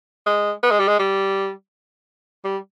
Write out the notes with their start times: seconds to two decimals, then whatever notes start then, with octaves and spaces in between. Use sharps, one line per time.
0.26 G#3
0.63 B3
0.71 G#3
0.79 G3
0.87 G#3
0.99 G3
2.44 G3